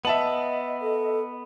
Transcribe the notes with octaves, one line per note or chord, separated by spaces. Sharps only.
B3 D#5 E5 A5 F#7
A4